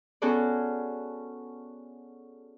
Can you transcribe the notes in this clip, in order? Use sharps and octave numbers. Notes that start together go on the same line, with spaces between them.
B3 C#4 F#4 G#4 A4 D5